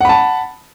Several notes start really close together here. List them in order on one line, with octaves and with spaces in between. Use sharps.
F#5 B5 A5